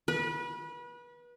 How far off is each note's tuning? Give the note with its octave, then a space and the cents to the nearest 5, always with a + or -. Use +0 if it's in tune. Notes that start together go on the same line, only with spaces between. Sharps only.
B4 -30